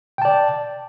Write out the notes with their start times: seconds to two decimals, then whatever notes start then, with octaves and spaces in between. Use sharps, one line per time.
0.18 G5
0.22 A5
0.25 D5